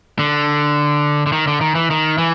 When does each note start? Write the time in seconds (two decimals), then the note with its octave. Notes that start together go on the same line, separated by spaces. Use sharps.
0.19 D3
1.26 D3
1.32 D#3
1.47 D3
1.61 D#3
1.75 E3
1.90 D#3
2.18 E3